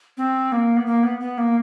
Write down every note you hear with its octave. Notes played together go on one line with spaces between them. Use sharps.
C4
A#3
B3
A#3
B3
B3
A#3